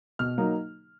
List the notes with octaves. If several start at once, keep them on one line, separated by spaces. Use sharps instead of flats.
B2 F6
F#3 A#3 D#4